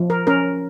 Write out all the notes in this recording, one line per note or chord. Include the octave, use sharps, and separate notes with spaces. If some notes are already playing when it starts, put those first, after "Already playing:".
Already playing: F3
A#4
C#4 A#4